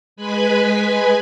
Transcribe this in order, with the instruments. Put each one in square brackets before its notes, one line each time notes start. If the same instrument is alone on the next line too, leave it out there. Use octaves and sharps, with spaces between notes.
[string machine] G#3 B4 G#5 B5